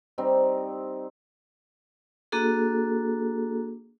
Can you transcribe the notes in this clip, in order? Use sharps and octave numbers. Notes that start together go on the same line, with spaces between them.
G3 C4 D#4
A#3 D4 F#4 G#4 A4